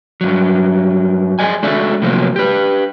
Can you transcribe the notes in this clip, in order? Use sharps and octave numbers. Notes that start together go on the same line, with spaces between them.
G2 F#3
G#4 A4 D5 D#5 G#5
G#3 D4 F#4 A4 D5 E5
A2 C3 F3 F#3 A#3
G4 B4